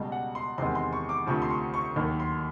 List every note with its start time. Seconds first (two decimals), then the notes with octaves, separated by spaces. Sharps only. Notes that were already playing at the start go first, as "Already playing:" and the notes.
Already playing: C#2 B2 G3
0.12 F#5
0.35 C6
0.58 E2 C3 D#3 G#3 C6
0.75 C6
0.93 C#6
1.09 D6
1.26 D2 C3 F3 C#6
1.42 C6
1.50 C#6
1.74 C#6
1.96 D#2 D#3 F#3 A#3 C#6
2.20 C6